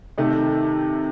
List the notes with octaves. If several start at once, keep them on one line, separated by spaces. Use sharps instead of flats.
C3 D#3 A3 D#4